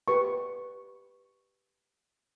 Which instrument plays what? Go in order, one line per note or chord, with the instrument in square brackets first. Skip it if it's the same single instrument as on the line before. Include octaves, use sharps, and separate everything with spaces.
[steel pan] G4 B4 C#6